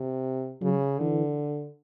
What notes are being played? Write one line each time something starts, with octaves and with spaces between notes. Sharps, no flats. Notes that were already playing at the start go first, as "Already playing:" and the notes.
Already playing: C3
C#3 F#3
D3 E3